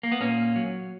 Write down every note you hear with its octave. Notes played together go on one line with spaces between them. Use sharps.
A#3
B3
A#2 A#3 C#4
F#3